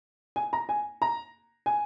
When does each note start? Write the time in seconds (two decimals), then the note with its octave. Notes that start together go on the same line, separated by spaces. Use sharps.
0.36 G#5
0.53 A#5
0.69 G#5
1.02 A#5
1.66 G#5